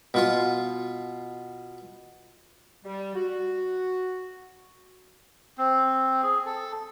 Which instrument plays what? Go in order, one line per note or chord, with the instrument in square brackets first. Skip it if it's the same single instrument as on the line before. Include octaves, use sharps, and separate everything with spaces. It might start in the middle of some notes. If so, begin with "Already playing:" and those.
[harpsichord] B2 F4 C6
[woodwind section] G3
F#4
[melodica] C4
G#4
A4